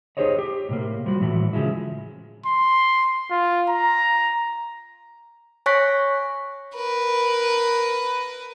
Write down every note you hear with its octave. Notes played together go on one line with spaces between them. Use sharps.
D#4 G4 G#4 C5 C#5 D#5
G4
A2 C3 A#3
F3 G3 F#4
A2 E3 A3 F#4
C#3 F3 G#3 E4
C6
F4
A#5
C#5 G#5 C#6 F#6 A#6 B6
A#4 B4